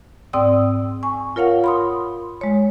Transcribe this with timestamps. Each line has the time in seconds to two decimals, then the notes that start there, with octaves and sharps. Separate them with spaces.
0.33 G#2 C4 D5 G5 D#6 E6
1.03 G#5 C#6
1.36 F4 A#4 C#5 F5 F#5
1.64 B5 C6 D#6
2.41 G#3 C#5